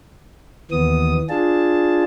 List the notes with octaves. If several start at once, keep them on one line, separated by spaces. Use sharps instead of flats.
D#2 E3 B3 D#6
D4 F4 G#4 A5